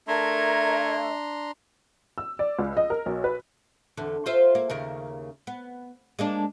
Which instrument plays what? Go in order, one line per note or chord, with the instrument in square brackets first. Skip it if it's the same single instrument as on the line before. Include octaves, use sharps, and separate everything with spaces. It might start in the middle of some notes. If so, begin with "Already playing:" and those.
[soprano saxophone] A3 [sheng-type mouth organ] D4 A#5 C6 [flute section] A#4 G#6 [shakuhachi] E5
[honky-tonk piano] E6
D5
C#2
D#5
A#4
B1
B4
[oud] E2 D3
F4 C5 E5
A#3
D#2 C#3 A#4
B3
G#3 A#3 D4